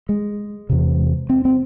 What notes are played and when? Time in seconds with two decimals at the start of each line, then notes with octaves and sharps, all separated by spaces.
0.09 G#3
0.69 E2 C3
1.29 C4
1.45 C4